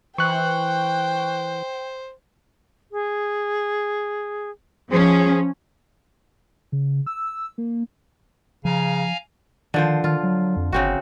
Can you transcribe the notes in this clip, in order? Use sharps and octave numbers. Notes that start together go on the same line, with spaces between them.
E3 C5 G5 C#6 F#6
G#4
F3 C#4 G#4
C#3
E6
A#3
C#3 F3 F5 G#5 A#5
D3 D#3 F3 C5
D#3 F4
F#3
F2
G1 C#3 C4 F#4